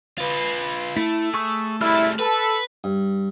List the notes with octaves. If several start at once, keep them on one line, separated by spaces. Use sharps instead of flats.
F4 B4
A3 E4
G#4 C#6 E6
G3 A3 E4 F6
A4 B4
G2